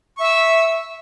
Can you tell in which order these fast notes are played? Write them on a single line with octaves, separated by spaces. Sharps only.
C#6 E5 E6